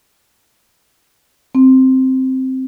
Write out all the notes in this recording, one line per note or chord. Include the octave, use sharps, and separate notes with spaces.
C4